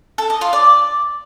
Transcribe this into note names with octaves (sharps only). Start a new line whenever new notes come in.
A4
D#5
F4
D5